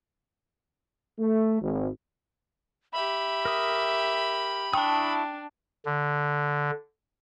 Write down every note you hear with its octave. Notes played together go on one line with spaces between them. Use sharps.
A3
G#1
G4 E5 B5
A#4 D#6
D4 E4 G5 A5 C#6 D#6
D3